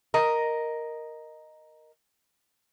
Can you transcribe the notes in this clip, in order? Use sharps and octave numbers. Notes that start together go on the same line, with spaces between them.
A#4 D#5